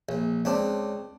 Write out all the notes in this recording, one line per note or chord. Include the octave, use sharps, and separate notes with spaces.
A#1
C#2 C4 D4